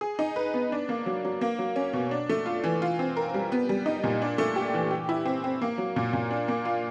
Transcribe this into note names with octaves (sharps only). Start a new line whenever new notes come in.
G#4
D#4
B4
B3
D4
A#3
F#3
F#3
A#3
F#3
C#4
B2
D4
A3
F4
E3
F4
C4
A#4
G3
B3
G3
D#4
A#2
D4
A3
G4
E3
G4
E4
C4
C4
A#3
F#3
A#2
A#2
D4
A#3
F4